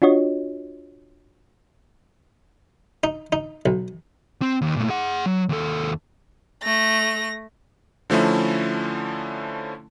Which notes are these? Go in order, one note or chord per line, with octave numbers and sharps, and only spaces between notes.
D4 F4 F#4 C#5 D#5
D#4
D#4
B1
C4
D#2
A#2 A3
G#4 F#5
F#3
D#2 A4
A3 A#6
D3 F3 A3 C#4 E4